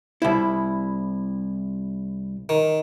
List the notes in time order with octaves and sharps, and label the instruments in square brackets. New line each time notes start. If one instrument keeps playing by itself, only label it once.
[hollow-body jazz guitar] C2 E4
[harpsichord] D#3